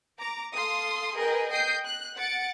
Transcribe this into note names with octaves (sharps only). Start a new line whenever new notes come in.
A#5 D6
A4 F5 C6 D#6
G#4 A#4 B4 D#5 G5
D#5 G5 D#6 G6 C7
F#6
F#5 A6 C#7 D7